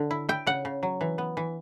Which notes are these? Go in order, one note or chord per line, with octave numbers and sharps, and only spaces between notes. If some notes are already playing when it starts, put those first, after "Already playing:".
Already playing: D3
E4
E4 G5
C#3 F#5
C#3
F#3
E3
B3
E3